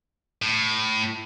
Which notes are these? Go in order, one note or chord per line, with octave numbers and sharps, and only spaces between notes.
A2